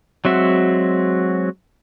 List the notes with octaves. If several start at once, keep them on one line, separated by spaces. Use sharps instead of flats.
F#3 G#3 C4 F#4 E5